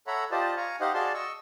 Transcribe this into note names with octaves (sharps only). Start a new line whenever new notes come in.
A4 C#5 E5 F#5 A#5 B5
F4 G4 C5 D5 D#5 A5
F5 G#5 A#5 C#6
D#4 G4 C5 D#5 F5 F#5
F#4 G#4 D5 F5 A5 C6
D#5 C#6 E6